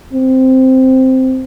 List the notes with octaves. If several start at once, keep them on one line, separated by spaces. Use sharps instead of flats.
C4